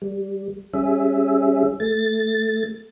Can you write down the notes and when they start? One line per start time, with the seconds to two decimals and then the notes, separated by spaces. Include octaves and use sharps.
0.02 G3
0.73 G3 C#4 G#4 E5
1.80 A3 A6